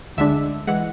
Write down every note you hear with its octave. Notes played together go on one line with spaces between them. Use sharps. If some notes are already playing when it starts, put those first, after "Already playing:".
D2 D3 G#3 D4 E5
E3 G#3 F#5